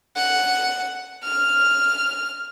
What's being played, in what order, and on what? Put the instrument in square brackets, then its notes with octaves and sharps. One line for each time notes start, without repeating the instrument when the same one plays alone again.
[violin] F#5
F6